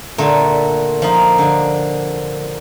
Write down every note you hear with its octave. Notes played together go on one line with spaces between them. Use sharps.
A#2 D3 A3
F3 D#4
D3